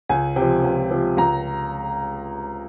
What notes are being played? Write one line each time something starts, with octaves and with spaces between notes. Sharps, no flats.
C#2 G#5
C3 G5
F3
C#2
C3 F3
C#2 A#5